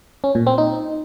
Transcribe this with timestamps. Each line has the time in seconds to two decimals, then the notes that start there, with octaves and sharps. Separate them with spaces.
0.24 C#4
0.35 A#2
0.47 C4
0.58 D#4